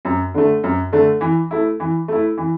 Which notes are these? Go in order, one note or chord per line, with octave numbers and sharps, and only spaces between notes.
F#2
D3 A3
F#2
D3 A3
E3
A3 E4
E3
A3 E4
E3